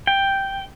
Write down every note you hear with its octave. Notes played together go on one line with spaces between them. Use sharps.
G5